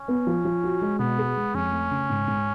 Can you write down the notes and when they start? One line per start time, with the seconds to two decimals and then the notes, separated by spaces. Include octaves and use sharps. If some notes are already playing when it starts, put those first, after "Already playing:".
Already playing: C#4
0.08 B3
0.27 F3
0.45 F3
0.64 F#4
0.82 G#3
0.99 B2 B3
1.19 G#4
1.36 G#3
1.54 F2 C#4
1.73 A3
1.91 C#3
2.10 G#2
2.27 G#2